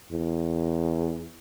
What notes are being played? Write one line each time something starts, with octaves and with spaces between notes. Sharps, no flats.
E2